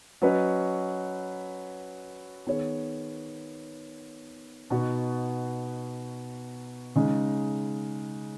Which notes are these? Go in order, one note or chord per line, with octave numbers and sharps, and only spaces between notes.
F#3 C#4 B4 D#5
D#3 B3 G#4 C#5
B2 B3 D#4 F#4
C#3 G#3 D#4